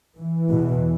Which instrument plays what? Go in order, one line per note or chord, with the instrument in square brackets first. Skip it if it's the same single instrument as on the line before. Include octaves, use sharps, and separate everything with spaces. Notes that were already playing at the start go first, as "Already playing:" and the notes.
[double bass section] E3
E2 B2